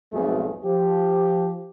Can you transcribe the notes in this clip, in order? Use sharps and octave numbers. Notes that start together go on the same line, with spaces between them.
B1 F2 G#2 B2 A3 G#4
F3 G4